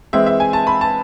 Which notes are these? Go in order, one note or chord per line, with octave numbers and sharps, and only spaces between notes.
E3 G#3 C4 E5
E5
G#5
A5
B5
A5